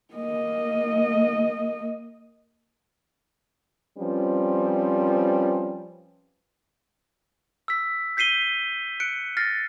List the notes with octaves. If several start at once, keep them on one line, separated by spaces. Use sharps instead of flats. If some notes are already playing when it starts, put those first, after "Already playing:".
A#3 D#5
F3 G3 C4 C#4 B4
E6 B6
G6 B6 C7 D#7 G7
F#6 C#7 D7
F6 A6 A#6 C7